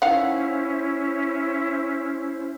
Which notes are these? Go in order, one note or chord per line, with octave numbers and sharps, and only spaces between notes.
D#3 C#4 E4 C5 F5 F#5